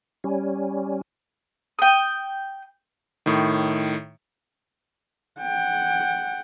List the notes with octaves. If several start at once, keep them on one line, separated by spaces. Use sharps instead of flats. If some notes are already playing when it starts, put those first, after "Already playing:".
G3 C#4
G5 D#6
A2 D#3
F#5 G5